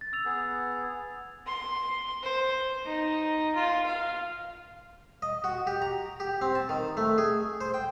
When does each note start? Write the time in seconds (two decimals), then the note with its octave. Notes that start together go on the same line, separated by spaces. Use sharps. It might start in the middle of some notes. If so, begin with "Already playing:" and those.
0.01 A6
0.13 E6 F7
0.25 B3 G#4
1.47 C6
2.23 C5
2.86 D#4
3.56 F4
3.86 F5
5.22 D#5
5.44 F#4
5.67 G4
5.82 A#5
6.20 G4
6.41 C4
6.55 A5
6.69 D#3
6.97 A3
7.18 G#4
7.61 C5
7.74 G5